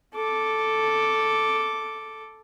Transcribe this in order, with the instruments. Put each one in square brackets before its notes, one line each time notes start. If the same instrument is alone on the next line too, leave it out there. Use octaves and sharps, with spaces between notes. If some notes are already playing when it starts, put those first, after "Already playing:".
[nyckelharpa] A4 D6